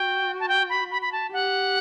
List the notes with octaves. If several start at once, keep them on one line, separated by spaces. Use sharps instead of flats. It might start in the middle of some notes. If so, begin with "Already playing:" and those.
Already playing: F#4 G5
A5
G5
B5
B5
B5
A5
G4 F#5